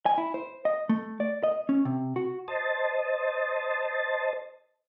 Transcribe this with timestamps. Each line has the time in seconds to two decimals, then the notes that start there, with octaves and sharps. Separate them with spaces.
0.06 G#5
0.18 E4
0.34 C5
0.65 D#5
0.89 A3
1.20 D5
1.43 D#5
1.69 C#4
1.85 C3
2.16 F#4
2.48 C5 D#5 A5